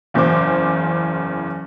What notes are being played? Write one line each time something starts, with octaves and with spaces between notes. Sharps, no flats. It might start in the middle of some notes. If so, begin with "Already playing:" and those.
F#1 E2 C#3 C5 D6